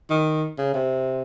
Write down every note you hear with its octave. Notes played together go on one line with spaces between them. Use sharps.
D#3
C#3
C3